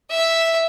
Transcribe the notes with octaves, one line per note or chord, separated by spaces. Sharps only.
E5